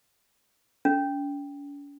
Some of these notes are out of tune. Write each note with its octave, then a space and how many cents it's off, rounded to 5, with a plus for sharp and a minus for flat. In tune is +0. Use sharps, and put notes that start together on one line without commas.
C#4 +45